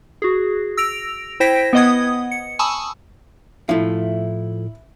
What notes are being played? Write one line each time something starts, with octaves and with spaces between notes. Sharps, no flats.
F#4 G#4
E6 A#6 D7 F7
E4 C5 G5 A#6 B6 D7
B3 B4 D#5 F#5 D#6 G#6
C#7
G#5 A5 B5 C#6 D#6 E6
A2 F3 A3 E4